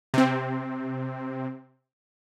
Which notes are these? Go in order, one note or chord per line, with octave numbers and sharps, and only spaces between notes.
C3 C4